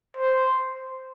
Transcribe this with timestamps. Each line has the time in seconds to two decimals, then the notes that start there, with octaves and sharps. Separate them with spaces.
0.17 C5